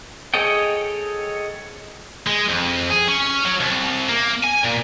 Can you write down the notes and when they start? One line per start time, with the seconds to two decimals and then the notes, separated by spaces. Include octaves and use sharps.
0.34 G#4 A4 C#5 D#5 G5
2.27 G#3
2.49 F2
2.90 G#4
3.08 C#4
3.45 F#3
3.60 C2
4.09 A#3
4.44 G#5
4.65 A#2